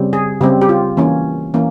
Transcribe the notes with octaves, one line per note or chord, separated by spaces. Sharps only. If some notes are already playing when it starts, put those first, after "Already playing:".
Already playing: C#3 G3 C4
G#4
C#3 G3 C4 G4
G4
F4
E3 A#3 C#4
E3 A#3 C#4